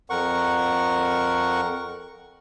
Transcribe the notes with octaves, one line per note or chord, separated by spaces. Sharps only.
F2 A#4 F#5 C#6